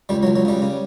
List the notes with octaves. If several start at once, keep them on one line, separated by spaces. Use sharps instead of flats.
C#2 G3
F#3
C#2
F#3
C#3 G3
C#3